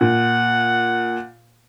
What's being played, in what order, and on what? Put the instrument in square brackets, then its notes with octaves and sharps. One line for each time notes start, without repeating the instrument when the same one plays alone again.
[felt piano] A#2 [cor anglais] F#5